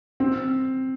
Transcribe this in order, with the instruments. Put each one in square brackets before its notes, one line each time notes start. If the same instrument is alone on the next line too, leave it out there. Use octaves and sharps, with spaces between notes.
[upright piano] C4